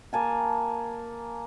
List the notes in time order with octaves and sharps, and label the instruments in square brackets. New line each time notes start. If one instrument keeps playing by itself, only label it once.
[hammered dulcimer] A#3 G#5 A5